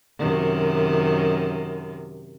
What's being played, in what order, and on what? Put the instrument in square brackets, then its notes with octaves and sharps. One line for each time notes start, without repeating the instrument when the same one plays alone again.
[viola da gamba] F#2 C3 D#3